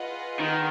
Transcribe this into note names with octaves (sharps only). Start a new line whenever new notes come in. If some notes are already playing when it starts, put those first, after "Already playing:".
Already playing: F4 G#4 B4 D#5 F#5
D#3